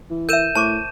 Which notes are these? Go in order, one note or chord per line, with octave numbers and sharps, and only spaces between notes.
E3
A#4 E5 G6 D#7 E7
A2 C5 A5 C#6 D6